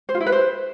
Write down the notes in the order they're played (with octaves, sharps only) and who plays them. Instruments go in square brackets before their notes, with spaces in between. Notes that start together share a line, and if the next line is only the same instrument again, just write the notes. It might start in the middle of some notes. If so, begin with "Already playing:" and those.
[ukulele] C5
F4
E4
B4
C5